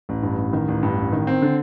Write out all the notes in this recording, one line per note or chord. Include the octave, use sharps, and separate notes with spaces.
A1
G2
A1
D#3
A1
G2
A1
D#3
C4
D3